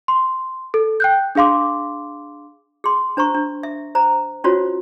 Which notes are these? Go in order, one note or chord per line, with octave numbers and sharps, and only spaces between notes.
C6
A4
G5 F#6 G6
D4 G#4 F5 C6 D6
G#4 C6
D4 C5 A#5 C#6
D4
E5
C5 A#5
C#4 F4 F#4 C5 C#5